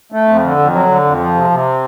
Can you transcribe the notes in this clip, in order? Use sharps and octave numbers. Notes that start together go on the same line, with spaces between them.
A3
F2
D3
F2
F#3
D3
F2
F3
C3
C3